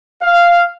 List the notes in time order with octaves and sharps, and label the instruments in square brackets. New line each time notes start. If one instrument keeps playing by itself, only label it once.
[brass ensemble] F5